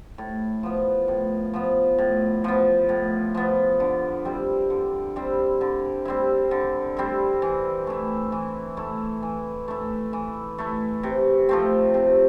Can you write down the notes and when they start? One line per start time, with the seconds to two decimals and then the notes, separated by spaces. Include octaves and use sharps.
0.18 A2
0.63 F3 B3
1.08 A2
1.54 F3 B3
1.98 A2
2.44 F3 B3
2.89 A2
3.35 F3 B3
3.80 D3
4.25 G3 C4 E4
4.70 D3
5.16 G3 C4 E4
5.61 D3
6.05 G3 C4 E4
6.51 D3
6.97 G3 C4 E4
7.42 E3
7.87 A3 E4
8.32 E3
8.77 A3 E4
9.22 E3
9.68 A3 E4
10.13 E3
10.58 A3 E4
11.03 C3
11.49 F3 A3 C4
11.94 C3